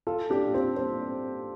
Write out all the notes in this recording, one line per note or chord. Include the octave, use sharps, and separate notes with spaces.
F4 A4
D4 G4
C4 F4
C4